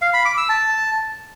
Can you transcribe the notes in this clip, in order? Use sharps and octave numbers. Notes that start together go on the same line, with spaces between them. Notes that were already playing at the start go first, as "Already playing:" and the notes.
F5
B5
D6
E6
A5